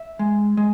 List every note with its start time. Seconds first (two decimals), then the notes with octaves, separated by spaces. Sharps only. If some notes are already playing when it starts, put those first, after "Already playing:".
Already playing: E5
0.19 G#3
0.57 G#3